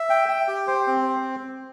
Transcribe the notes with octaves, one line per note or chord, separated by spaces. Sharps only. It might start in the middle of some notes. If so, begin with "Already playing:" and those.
Already playing: E5
G5
G5
G4
C5
C4